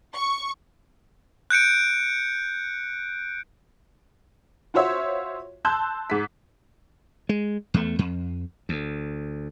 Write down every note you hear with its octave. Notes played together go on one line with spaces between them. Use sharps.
C#6
F#6 G6 C#7 D7
F4 F#4 C5 C#5 E5
A5 C6 E6 F#6 G6
G#2 B6
G#3
E2 A3
F2
D2